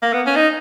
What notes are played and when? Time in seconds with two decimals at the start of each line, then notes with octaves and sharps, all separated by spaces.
0.02 A#3
0.13 B3
0.27 C#4
0.36 D#4